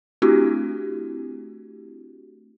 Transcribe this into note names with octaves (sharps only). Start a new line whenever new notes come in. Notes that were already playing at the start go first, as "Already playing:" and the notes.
A3 C4 D4 E4 F#4 G4